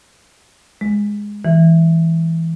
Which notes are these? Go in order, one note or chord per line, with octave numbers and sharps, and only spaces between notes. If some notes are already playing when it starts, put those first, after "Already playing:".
G#3
E3